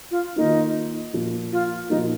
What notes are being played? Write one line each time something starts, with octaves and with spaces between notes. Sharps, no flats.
F4
D#3 A#3 D#4 F4
A#2 F3 A#3
F4
A#2 F3 A#3 D#4